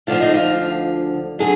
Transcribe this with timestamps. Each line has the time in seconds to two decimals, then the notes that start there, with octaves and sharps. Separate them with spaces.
0.07 D2 D3 F3 F4
0.21 D#4
0.34 F4
1.39 D3 F#3 G#4